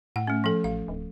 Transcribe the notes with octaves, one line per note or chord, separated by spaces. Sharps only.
A2 F#5
A3 C#4
F3 A4
A1 F5
D1